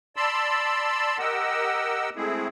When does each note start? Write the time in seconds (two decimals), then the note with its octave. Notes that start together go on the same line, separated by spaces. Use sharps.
0.16 D5 A5 B5 C6 E6
1.19 G4 A#4 D#5 F#5 E6
2.16 G#3 A3 C4 E4 G#4